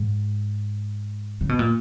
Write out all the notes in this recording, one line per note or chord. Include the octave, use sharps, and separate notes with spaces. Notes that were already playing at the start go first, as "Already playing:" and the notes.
Already playing: G#2
C#3
B2
A#2